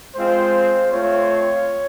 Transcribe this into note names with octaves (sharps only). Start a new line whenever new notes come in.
G#3 C4 F4 C5
A3 C4 F4 C#5